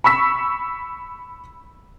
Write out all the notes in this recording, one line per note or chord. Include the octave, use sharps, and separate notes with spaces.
B5 C#6 E6 B6